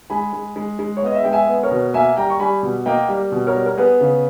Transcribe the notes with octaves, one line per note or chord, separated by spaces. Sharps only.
G#3 G#5 B5
G#3
G#3
G#3
C#5
B3 D#5
E5
G#3 G5
E5 G#5
B3
A#4 C#5
B2
A#3 E5 G#5
G3 G5 A#5
C#6
G3 G#5 B5
B2
A#3 D#5 G5
G3
B2
A#4 C#5
G3
A#4
B3 G#4 B4
C#3